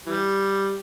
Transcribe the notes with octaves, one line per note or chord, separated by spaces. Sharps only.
E3 G3